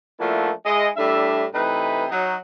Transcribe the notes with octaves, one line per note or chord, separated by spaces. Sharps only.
F3 A3 A#3 D4 E4 F#4
G#3 E4 D#5
A2 G3 D4 E5
C3 E3 A3 D#4 B4
F#3 D#4